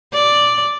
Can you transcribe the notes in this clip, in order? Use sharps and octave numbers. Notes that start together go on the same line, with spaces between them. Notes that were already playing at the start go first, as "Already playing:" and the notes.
D5